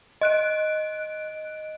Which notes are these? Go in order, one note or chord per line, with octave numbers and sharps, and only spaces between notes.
D#5 F#6 D7